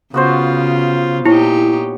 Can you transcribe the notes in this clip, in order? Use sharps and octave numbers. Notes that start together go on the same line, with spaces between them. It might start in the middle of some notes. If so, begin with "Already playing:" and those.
C#3 B3 F4 F#4 C5
A#2 D#4 E4 G4 C#5 G#5